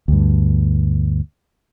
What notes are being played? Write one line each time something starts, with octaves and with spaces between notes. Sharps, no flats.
D2 G2